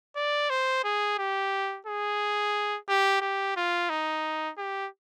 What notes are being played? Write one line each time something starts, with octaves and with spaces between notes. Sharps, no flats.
D5
C5
G#4
G4
G#4
G4
G4
F4
D#4
G4